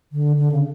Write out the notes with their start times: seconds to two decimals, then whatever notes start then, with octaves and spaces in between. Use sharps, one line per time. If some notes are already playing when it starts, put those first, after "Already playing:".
0.12 D3
0.37 D3
0.52 C#3